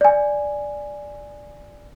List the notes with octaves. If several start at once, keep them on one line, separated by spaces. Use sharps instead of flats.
D5 G#5